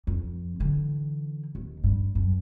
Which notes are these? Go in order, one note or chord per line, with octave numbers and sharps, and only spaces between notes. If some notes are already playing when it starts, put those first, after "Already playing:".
F2
D3 E3
D#2
G2
F#2